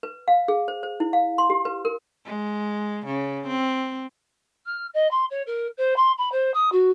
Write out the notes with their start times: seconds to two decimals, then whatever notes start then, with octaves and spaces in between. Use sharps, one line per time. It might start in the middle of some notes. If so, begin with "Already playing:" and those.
0.03 B4
0.28 F5
0.48 G#4
0.68 C5
0.83 C5
1.00 E4
1.13 F5
1.38 C6
1.50 G4
1.65 B4
1.85 A#4
2.26 G#3
3.06 C#3
3.47 C4
4.66 F6
4.94 D#5
5.11 C6
5.30 C#5
5.47 A#4
5.78 C5
5.96 C6
6.18 B5
6.32 C5
6.54 D#6
6.72 F#4